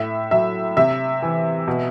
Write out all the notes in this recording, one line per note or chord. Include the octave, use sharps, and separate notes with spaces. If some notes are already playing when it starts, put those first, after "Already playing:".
Already playing: A2 E5
F#3 E5
C3 E5
E3
B2